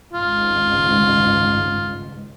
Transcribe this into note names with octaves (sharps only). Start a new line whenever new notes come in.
G#1 C#2 G#2 F4